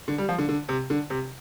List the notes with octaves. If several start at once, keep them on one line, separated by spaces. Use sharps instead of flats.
D3
G3
F3
D3
D3
C3
D3
C3